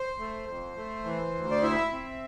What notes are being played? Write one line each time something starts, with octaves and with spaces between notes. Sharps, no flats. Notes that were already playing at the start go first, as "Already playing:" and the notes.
Already playing: C5
A3
F2
A3
E3
D2
D5
E4 E5
C4